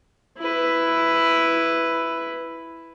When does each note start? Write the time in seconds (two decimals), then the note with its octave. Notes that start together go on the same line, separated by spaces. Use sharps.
0.38 E4 B4